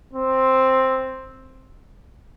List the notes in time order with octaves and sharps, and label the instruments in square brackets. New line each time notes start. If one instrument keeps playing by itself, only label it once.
[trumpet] C4